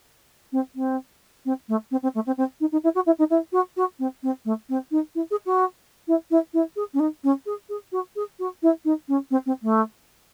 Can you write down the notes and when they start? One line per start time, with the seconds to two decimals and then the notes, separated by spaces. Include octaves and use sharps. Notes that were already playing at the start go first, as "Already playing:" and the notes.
0.52 C4
0.75 C4
1.45 C4
1.69 A3
1.91 C4
2.03 C4
2.15 A3
2.26 C4
2.38 C4
2.60 D#4
2.72 D#4
2.84 E4
2.95 F#4
3.06 E4
3.19 D#4
3.30 E4
3.52 F#4
3.77 F#4
3.99 C4
4.23 C4
4.45 A3
4.69 C4
4.91 D#4
5.15 E4
5.31 G#4
5.46 F#4
6.08 E4
6.31 E4
6.54 E4
6.76 G#4
6.94 C#4
7.00 D#4
7.24 C#4
7.46 G#4
7.69 G#4
7.92 F#4
8.16 G#4
8.39 F#4
8.62 E4
8.85 D#4
9.08 C#4
9.31 C4
9.46 C4
9.63 A3